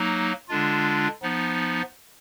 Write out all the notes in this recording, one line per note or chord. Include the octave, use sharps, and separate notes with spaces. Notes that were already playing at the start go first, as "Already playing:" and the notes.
Already playing: F#3 A#3 D#4
D3 G#3 D4 F4
F3 B3 D#4